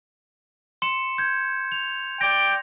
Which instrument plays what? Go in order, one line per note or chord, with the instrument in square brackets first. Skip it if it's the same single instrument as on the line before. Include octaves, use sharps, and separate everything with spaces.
[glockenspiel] C6 C#7 E7
G6 G#6
F7
[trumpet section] D5 G5 [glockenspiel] A#6